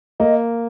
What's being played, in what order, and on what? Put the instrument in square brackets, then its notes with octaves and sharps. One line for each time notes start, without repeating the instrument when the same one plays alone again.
[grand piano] A#3 [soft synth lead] D#5